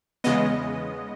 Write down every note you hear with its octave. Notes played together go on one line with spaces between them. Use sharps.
E2 C#3 G#3 B3 D#5